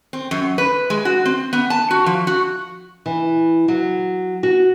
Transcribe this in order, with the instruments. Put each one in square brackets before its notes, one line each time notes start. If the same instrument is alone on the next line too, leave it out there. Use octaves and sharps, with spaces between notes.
[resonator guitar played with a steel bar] C4
F#2
B4
G#3
F#4
C4
B3
A5
F#4
F3
F#4
[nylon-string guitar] E3
F#3
F#4